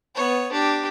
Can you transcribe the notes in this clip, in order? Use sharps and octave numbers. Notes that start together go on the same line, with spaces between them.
B3 C#5
D4 G4